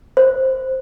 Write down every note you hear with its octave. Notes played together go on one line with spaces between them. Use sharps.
C5